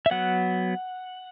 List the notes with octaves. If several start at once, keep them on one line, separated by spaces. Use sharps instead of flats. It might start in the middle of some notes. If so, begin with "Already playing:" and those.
E5
F#3 B3 F#5